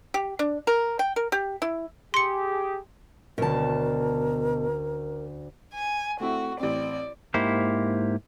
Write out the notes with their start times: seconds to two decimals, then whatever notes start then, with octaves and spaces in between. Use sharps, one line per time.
0.14 G4
0.39 D4
0.67 A#4
0.99 G5
1.16 A#4
1.32 G4
1.62 E4
2.14 G4 G#4 C6 C#7
3.38 D2 B2 C#4 A#4 A5
5.73 G#5
6.20 A3 C4 E4 F#4
6.60 A1 C4 D5
7.34 G#2 A#3 E4 G4 C5